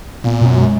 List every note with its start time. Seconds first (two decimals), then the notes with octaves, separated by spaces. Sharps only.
0.24 A#2 B3
0.41 F#2 B2
0.57 G#3